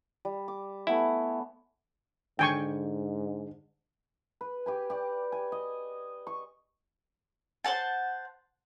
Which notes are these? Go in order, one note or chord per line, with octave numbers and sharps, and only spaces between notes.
G3
D6
A3 B3 E4 G#5
G#2 D3 G5 G#5 C#6
B4
G4 B4 G#5
G4 D5
G#5
D#5
C#6
C5 C#5 F#5 A5